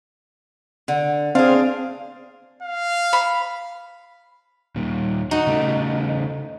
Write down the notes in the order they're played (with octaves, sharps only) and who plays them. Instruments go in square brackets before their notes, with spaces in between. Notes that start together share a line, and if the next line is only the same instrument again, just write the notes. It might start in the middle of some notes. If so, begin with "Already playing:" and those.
[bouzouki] D3
[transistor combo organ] C4 F5 [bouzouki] D4 G#4
[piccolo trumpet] F5
[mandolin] B5
[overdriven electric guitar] D#2 A#2
[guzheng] D#4 [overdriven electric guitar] F#4
[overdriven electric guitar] C#3 A3